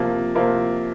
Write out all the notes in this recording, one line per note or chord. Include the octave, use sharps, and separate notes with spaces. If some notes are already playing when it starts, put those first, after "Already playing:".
Already playing: C3 F3 A#3
C3 F3 A#3